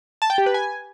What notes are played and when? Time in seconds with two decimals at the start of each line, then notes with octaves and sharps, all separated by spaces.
0.22 A5
0.30 G5
0.38 G4
0.46 B4
0.54 G#5